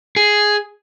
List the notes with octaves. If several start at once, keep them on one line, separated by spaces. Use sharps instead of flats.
G#4